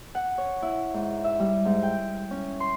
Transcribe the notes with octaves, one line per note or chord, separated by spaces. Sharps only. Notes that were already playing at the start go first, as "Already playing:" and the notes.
F#5
C#5
E4
G#2
E5
G3
G#2
G5
C#4
C6